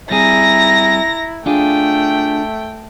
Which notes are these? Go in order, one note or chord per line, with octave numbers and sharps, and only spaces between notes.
G3 C4 E4 G#4 A#5 A#6
A3 D4 F4 G#4 G5